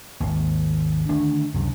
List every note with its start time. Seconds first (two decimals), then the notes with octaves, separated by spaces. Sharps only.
0.20 G#1 D#2
1.09 D3 D#3 A3 D4
1.54 C#2 F#2 C3